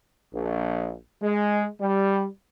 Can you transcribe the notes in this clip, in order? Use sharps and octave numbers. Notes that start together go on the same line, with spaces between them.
A#1
G#3
G3